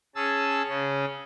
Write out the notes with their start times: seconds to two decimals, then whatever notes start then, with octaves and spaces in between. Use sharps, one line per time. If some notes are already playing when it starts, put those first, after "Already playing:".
0.16 C#4 G#4 A5 E6
0.69 C#3 C#4